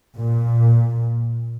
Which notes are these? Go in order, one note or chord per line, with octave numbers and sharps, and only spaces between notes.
A#2